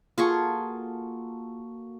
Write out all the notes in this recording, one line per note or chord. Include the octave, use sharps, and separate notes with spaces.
A#3 F4 F#4 G#4 A4 C#6